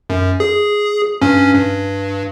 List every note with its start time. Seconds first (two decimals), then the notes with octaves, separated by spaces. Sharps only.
0.10 F#2
0.40 G#4
1.21 G2 C#4
1.55 G2